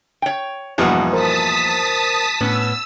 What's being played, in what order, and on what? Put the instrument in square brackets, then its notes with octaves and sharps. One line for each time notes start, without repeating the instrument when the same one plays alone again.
[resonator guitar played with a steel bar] C#5 G5
[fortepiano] E2 G2 B2 [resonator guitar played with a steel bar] F3 A#3 F#5
[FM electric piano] A#4 C5 [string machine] A5 D#6 B6
[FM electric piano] A2 [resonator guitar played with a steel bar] B3 C#4 [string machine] E6